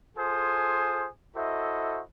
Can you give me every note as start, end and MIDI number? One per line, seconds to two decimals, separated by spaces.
0.17 1.08 65
0.17 1.08 68
0.17 1.08 69
0.17 1.08 72
0.17 1.08 80
0.17 1.08 87
1.35 2.01 64
1.35 2.01 66
1.35 2.01 69
1.35 2.01 72
1.35 2.01 75
1.35 2.01 76